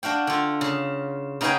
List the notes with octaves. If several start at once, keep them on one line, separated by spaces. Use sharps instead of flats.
D4 F#4 F5 G5
D3 F4
C#3
C#3 D#4 F#4 B4 G5 G#5